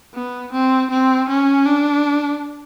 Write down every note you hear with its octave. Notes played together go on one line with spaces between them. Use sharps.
B3
C4
C4
C#4
D4